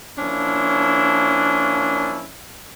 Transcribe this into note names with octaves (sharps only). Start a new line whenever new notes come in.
F3 A#3 C#4 D4 E4